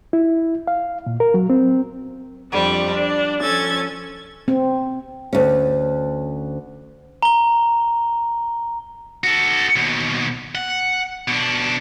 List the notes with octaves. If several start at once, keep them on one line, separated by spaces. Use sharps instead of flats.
E4
F5
A#2
A#4
F#3
C4
F2 G3 D4
D4
F3 C#4 A4 G#6 A6
C4
D2 C#4
A#5 G7
F#4 A4
D#2 B2
F#5
B2 D4